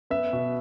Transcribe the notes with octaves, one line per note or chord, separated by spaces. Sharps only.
B3 E5
B2